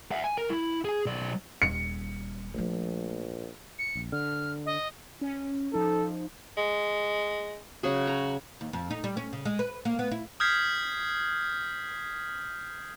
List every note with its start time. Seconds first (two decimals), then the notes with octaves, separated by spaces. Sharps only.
0.11 E5 F#5
0.24 G#5
0.38 A#4
0.50 E4
0.85 G#4 G#5
1.06 B1 D5
1.62 D#1 G3 C#7
2.54 A#1 F3 A3
3.79 C#7
3.95 A#1
4.12 D3 F6
4.66 D#5
5.21 C#4
5.74 F3 D#4 A4
6.57 G#3
7.83 C#3 F#3 F#4 G#4
8.07 A#5
8.61 D#2
8.73 F2
8.91 D#4
9.04 G3
9.17 C#4
9.33 C#3
9.45 G#3
9.59 B4
9.85 A#3
9.99 B3
10.11 E4
10.40 D#6 F6 G6 G#6 B6 C7